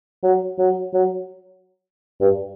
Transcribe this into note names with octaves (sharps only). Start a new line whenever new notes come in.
F#3
F#3
F#3
G2